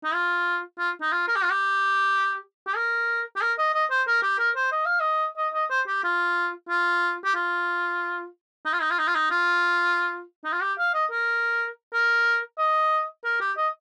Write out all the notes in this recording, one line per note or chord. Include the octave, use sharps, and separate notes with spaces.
D#4
F4
F4
D#4
F4
A#4
G4
F4
G4
G4
A#4
G4
A#4
D#5
D#5
C5
A#4
G4
A#4
C5
D#5
F5
D#5
D#5
D#5
C5
G4
F4
F4
G4
F4
D#4
F4
D#4
F4
D#4
F4
D#4
F4
D#4
F4
G4
F5
D#5
A#4
A#4
D#5
A#4
G4
D#5